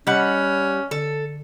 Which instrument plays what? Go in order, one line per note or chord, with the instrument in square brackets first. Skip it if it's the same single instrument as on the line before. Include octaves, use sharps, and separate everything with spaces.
[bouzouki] G3 F#5 [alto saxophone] C#4 [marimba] D#5
[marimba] D3 [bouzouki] A4